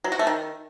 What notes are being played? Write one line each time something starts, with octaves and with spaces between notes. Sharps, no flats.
F#3
F#4
A3
D#3